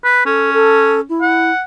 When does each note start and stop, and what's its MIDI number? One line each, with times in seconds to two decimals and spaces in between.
0.04 0.22 71
0.26 1.05 61
0.26 0.53 69
0.53 1.01 69
1.09 1.51 64
1.21 1.63 78